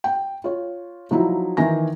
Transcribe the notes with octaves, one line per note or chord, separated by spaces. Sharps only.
G5
F4 C#5
F3 F#3 D#4 E4
D#3 E3 G#5 A#6